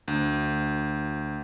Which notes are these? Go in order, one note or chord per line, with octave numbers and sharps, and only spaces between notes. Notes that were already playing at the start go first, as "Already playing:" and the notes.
D2